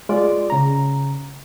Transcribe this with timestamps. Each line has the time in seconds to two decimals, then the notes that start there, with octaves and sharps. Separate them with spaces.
0.09 G#3 F4 D5 D6
0.50 C#3 A#5